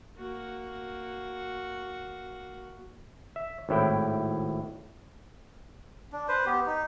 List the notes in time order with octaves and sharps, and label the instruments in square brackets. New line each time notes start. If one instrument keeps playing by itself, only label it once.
[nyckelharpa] A#3 F#4
[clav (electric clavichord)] E5
G#1 A2 E4 G5
[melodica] D4
B4 C5
B3 G4
D#4